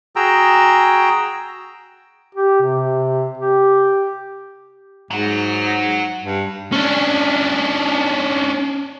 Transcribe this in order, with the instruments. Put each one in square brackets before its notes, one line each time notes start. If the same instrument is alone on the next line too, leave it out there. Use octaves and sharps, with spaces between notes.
[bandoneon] F#4 G#4 G5 A#5 E6
[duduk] G4
C3
G4
[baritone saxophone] G#2 [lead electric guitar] F#3 F#4
[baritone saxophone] G2
[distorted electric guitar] C#4 D4